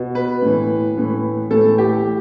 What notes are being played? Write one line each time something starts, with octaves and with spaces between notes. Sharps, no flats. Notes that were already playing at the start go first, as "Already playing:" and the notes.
Already playing: B2
B4
A2 E3
A2 E3
A2 E3 A4
G4